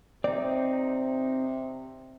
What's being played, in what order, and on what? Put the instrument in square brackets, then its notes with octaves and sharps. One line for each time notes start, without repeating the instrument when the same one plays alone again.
[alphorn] C3 [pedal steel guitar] C4 D#4 [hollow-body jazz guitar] D5